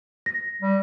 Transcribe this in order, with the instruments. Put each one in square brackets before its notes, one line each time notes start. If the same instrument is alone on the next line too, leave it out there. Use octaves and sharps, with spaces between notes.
[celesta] A#6
[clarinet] G3